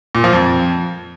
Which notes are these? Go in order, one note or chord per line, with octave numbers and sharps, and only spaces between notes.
A#2
F3
F2